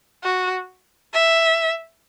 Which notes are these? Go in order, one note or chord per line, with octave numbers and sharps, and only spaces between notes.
F#4
E5